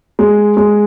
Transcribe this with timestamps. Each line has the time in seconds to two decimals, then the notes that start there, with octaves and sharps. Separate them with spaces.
0.19 G#3
0.57 G#3